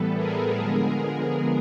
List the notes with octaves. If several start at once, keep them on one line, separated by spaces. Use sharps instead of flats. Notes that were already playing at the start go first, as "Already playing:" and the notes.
Already playing: A2 E3 G3 B3 A4 B4
G#4 A#4
D3 F3 G#3 B3